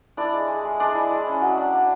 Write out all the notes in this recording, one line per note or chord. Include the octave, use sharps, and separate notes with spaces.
D4 E4 D5
G#3
G#3
G#3
G#3 D4 D5
E4
G#3
C#4
F#3
D4
D4